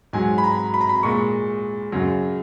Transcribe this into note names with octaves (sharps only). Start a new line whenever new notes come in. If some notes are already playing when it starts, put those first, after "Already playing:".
G#2 F#3 G#5
B5
A#5
B5
A#5
B5
A#2 G#3 C#6
F#2 C#3 F#3